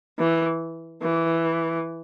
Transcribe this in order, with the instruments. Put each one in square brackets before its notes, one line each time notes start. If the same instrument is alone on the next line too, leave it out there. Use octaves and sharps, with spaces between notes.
[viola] E3
E3